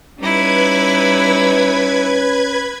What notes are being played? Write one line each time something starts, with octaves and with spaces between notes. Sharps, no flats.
G3 C#4 D#4 E4 B4 B5 G#6